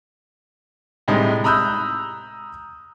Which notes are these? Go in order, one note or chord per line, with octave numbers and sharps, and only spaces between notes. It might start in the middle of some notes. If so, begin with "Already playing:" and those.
A2 C3 G3 G#3 D#4
A#5 B5 D#6 E6 F#6 G6